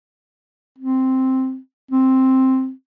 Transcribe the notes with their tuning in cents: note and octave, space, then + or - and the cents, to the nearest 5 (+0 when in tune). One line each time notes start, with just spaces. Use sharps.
C4 +0
C4 +5